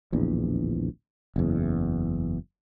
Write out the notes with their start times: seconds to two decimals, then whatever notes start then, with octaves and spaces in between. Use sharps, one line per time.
0.12 D1 A#1 E2
1.36 F#1 E2